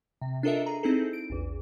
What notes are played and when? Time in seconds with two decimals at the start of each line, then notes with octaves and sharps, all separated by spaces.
0.22 C3
0.43 D4 F4 A4 A#4 D#5 E5
0.66 G#4 A#5
0.83 C4 D#4 E4 G#4 A4
1.13 D7
1.30 A#1 E2